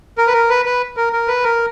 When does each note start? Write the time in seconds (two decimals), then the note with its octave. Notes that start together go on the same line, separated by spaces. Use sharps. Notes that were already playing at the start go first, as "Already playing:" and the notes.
0.18 A#4
0.27 B4
0.34 A#4
0.50 B4
0.65 B4
0.97 A#4
1.13 A#4
1.28 B4
1.44 A#4